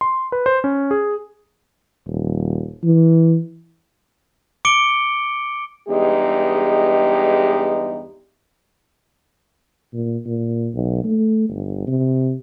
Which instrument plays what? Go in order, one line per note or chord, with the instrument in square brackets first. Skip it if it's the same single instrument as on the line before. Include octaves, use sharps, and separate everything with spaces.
[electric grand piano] C6
B4
C5
C#4
G#4
[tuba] D#1
E3
[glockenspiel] D6 C#7 D7 G7
[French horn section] E2 G2 G#3 D#4 G4
[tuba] A#2
A#2
B1
A3
G1
C3